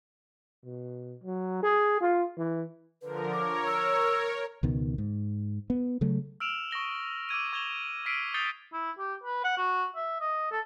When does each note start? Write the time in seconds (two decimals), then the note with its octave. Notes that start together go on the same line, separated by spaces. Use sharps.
0.65 B2
1.24 F#3
1.63 G#4
2.01 F4
2.38 E3
3.02 D3 F3 A#4 B4
3.33 A#4 C#5 D6
3.66 E6
4.63 C#2 B2 D#3
4.98 G#2
5.70 B3
6.01 C#3 F#3 A3
6.40 E6 F6 D7 E7 F7
6.71 C#6 D#6 A#6 G7
7.29 D6 E6 G#6 D#7
7.53 C#6 G#6 E7 F7 G7
8.06 E6 F6 B6 C7 D7 D#7
8.34 D#6 G6 A6 C7 C#7 G7
8.73 E4
8.99 G4
9.24 B4
9.44 F#5
9.58 F#4
9.95 E5
10.21 D#5
10.51 A4